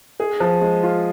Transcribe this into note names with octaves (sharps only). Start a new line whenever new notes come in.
G#4
F3
G#3
F4